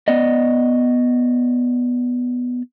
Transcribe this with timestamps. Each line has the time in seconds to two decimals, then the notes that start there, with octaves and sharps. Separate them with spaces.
0.08 B3 D5 D#5